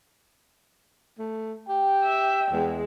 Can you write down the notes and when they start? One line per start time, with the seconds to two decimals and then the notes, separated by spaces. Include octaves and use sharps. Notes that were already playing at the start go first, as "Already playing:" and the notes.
1.19 A3
1.68 G4 G5
2.04 E5
2.52 E2 G#3